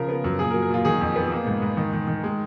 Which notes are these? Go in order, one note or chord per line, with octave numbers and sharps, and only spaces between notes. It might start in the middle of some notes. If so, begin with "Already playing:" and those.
Already playing: C#3 F3 A#4
B3
F#2
A#2 G#4
A#4
F#3
A#4
A#2 F4
D#3 G#4
F2
B3
A#3
G#2
G#2
D#3
D#3
D#3
G#3